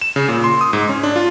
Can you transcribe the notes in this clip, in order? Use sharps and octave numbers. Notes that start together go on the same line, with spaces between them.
E7
C#3
A#2
C6
D#6
G#2
C#4
D4
F4